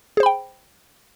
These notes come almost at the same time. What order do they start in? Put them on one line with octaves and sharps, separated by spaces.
G#4 C5 B5 G5